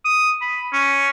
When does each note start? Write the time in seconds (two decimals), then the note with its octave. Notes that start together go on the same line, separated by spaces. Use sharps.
0.05 D#6
0.42 B5
0.73 C#4